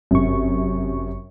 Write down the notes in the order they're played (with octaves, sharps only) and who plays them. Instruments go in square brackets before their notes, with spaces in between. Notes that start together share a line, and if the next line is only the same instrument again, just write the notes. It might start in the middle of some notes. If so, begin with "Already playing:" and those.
[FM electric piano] G1 C#6 [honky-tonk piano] F#2 C3